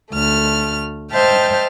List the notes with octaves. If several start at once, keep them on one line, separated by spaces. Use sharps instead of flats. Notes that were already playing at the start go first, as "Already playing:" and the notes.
D2 A3 F6
C5 D#5 E5 G5 A5 F6